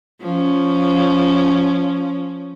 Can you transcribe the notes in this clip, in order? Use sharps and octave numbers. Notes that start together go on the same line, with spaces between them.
F3 C#4